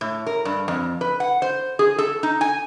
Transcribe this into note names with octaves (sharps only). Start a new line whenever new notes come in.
A2
A#4
G2
F2
B4
F#5
C5
G#4
A4
D#4
G#5